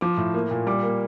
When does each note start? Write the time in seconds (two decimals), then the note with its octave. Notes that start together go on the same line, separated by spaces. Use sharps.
0.01 F3 D6
0.17 A2
0.34 A#3
0.51 A#2
0.67 G3 D6
0.83 A#3